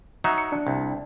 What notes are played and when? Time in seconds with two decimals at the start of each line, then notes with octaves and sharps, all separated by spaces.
0.24 F#3 D#4 E5
0.38 C#7
0.52 D4
0.67 C2